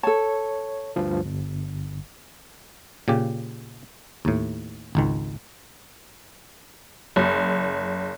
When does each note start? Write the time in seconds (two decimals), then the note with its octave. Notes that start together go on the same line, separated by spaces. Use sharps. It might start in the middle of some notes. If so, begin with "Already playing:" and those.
0.03 A4 C#5 A5
0.96 D2 G2 F3
1.25 G1
3.08 A#2 C#3 G4
4.25 D#2 A2
4.95 G#1 C#2 D#3
7.16 F#1